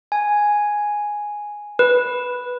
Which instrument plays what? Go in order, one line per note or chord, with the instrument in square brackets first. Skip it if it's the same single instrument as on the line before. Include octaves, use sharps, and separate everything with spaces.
[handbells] G#5
B4